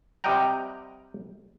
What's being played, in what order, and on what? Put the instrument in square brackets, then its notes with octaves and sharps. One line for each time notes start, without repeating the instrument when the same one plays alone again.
[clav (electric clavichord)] C3 G3 D#5 F#5 G5 A#5